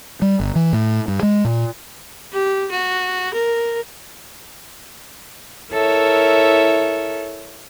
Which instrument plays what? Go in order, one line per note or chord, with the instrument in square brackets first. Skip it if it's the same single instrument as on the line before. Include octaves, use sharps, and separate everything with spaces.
[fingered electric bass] G3
G1
E3
A2
G2
G#3
A#2
[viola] G4
F#4
A#4
[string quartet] E4 A4 A#4 C#5 E5